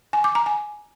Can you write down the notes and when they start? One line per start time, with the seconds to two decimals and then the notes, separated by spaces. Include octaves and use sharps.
0.13 G#5
0.24 D6
0.35 A#5
0.46 G#5